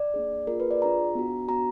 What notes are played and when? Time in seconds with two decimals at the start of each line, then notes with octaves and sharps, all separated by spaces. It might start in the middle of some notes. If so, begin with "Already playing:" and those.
Already playing: D5
0.14 A#3 D4 G#4
0.47 A#3 F4 G#4 A#4
0.60 B4
0.71 D5
0.81 D4 F4 G#4 A#5
1.15 B3 D4 F#4
1.48 B3 D4 F#4 A#5